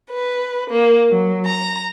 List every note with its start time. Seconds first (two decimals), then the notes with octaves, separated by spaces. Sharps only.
0.10 B4
0.70 A#3
1.10 F#3
1.47 A#5